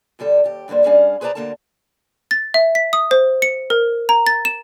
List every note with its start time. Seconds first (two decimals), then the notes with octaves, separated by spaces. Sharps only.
0.19 G2 D3 G3 A4
0.44 D#2 G4
0.68 G2 D3 G3 A#3 C5
0.85 G3 C#4 D4 G#4 F5
1.21 G#4 B4 C5 D5 A5 A#5
1.35 D2 B2 D3 A#3 A#4 A5
2.31 A6
2.54 E5
2.75 B6
2.93 D#6
3.11 C5
3.42 C#7
3.70 A#4
4.09 A#5
4.27 A6
4.45 E7